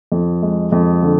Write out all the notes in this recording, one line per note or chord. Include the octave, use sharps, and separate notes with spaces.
F2
G#3
F2
D3